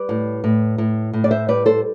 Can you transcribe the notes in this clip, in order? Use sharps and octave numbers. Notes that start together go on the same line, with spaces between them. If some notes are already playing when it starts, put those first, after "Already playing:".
Already playing: G3 B4 D5
A2
A2
A2
A2
D5
C5 E5
G3 B4 D5
A4 C5